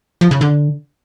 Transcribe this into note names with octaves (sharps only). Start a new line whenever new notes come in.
F3
C#3
D3